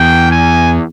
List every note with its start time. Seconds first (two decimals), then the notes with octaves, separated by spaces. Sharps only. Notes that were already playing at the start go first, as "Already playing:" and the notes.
Already playing: E2 G5
0.31 G#5